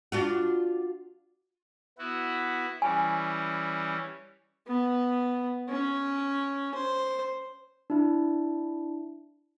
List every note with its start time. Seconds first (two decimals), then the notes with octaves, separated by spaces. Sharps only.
0.12 D4 F4 F#4
1.98 B3 E4 F#4
2.82 E3 G3 C#4 G#5
4.67 B3
5.69 C#4
6.74 C5
7.90 D4 E4